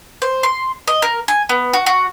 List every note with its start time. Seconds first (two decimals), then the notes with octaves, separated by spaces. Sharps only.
0.22 C5
0.43 C6
0.88 D#5
1.02 A#4
1.28 G#5
1.49 B3
1.73 F#4
1.86 F#4